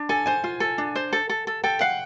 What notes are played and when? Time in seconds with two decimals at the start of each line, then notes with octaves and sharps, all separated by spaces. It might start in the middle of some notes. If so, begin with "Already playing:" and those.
Already playing: D4
0.09 A4 G#5
0.26 C5 G#5
0.44 F4
0.60 A4
0.78 D4
0.95 C5
1.13 A4
1.30 A4
1.47 A4
1.64 A4 G5
1.81 F5 F#5